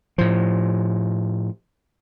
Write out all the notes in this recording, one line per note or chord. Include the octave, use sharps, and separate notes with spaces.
A2 F3